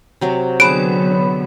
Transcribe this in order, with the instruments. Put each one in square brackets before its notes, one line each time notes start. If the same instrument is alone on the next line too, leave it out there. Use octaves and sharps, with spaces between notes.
[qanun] C3 F#3 F#4
[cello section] D3 F#3 B3 [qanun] G#4 F#5 [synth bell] C#5 B5 [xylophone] D7